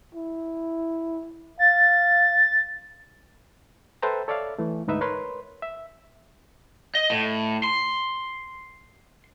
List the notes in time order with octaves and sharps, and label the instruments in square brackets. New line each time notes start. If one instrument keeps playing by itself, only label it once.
[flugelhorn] E4
[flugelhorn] F5 [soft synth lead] A6
[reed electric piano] A4 B4 C5 E5 G5 A#5
A4 C#5 D5 E5 F5
E3 A3
D2 G#2 D#4 B4 E5
A#4 B4 C#5 C6
E5
[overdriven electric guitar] D#5
A2
C6